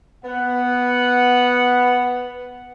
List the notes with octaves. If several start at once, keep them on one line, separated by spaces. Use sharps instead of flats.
B3 F#5